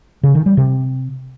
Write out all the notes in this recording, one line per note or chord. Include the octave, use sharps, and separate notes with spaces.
C#3
D#3
G3
C3